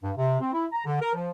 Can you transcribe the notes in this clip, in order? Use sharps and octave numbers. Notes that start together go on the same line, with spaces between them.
G2
C3
C4
E4
A#5
D3
A#4
F3